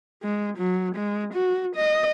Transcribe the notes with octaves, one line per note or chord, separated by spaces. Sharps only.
G#3
F#3
G#3
F#4
D#5